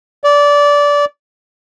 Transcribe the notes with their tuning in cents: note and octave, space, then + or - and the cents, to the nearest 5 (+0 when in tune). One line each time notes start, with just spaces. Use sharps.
D5 -20